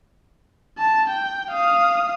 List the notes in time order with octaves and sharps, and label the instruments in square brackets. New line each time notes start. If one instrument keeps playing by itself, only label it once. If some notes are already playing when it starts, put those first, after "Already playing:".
[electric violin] A5
G5
F5 D#6